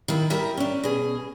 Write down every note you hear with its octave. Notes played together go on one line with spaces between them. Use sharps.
D#3 E4
G3 G4 A#4 E5
C#4 D4
B2 G#4